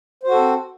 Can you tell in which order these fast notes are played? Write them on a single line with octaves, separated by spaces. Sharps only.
C5 F#4 A4 C4